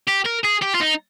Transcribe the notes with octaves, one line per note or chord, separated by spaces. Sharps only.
G4
A#4
G#4
G4
F4
D#4